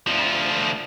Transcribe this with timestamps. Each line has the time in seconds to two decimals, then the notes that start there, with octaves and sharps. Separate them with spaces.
0.07 D2 F3